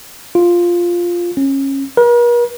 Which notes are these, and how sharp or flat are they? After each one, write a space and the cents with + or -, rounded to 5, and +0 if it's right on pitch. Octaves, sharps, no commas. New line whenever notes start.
F4 +0
C#4 -25
A#4 +45